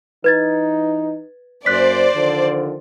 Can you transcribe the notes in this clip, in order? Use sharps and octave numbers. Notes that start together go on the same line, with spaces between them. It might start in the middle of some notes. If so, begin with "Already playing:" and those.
E3 D#4 B4 G#6 A6
F#2 A#3 C5 D5 F#6 B6
D3 D#3 F3